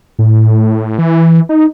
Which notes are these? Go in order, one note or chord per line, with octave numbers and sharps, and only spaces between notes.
A2
E3
D#4